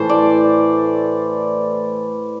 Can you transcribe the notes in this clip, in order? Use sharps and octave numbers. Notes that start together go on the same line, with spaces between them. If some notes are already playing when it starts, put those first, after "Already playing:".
Already playing: A2 E3 A3 C5
D5